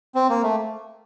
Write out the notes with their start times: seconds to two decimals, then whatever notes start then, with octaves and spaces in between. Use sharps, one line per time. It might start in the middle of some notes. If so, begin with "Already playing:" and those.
0.15 C4
0.29 A#3
0.43 A3